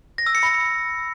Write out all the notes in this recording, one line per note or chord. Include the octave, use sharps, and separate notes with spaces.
A#6
E6
C#7
B5